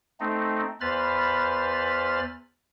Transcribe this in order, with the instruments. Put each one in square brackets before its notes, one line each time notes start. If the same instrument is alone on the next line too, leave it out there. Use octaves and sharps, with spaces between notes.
[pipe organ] A3 C4 D#4
E2 B4 C5 B5 F6 A6